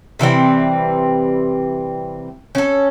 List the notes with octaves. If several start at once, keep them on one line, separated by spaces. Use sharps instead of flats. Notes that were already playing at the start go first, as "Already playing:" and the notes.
C3 E3 G3 C4
C#4 A4